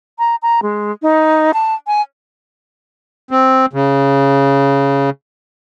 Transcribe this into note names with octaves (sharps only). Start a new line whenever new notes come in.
A#5
A#5
G#3
D#4
A5
G#5
C4
C#3